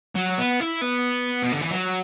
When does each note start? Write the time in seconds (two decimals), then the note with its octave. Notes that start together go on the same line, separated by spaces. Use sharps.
0.15 F#3
0.38 B3
0.60 E4
0.81 B3
1.44 B2
1.52 D3
1.62 E3
1.71 F#3